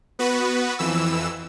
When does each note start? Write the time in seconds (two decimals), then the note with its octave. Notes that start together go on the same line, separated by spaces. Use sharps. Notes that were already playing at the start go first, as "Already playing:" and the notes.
0.19 B3 F#4 B4
0.79 F2 E3 E6